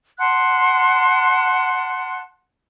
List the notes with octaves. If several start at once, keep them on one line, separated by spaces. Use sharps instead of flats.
F#5 A5 C6 F#6